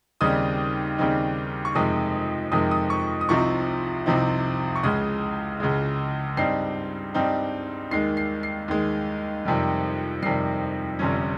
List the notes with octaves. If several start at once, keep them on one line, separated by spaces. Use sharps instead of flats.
D#2 C#3 G3 C4 D#4 D#6
D#2 C#3 G3 C4 D#4
C#6
F2 C3 D#3 G#3 D#6
F2 C3 D#3 G#3 D#6
D#6
C#6
D#6
C2 C3 F3 C4 D#4 C#6
C2 C3 F3 C4 D#4
C#6
C#2 C#3 G#3 D#6
C#2 C#3 G#3
G2 G3 C4 D#4 C7
G2 G3 C4 D#4
D#2 D#3 G#3 C7
C7
C7
D#2 D#3 G#3
F2 C3 D#3 G3
F2 C3 D#3 G3 C7
G1 F2 C3 G3 C#4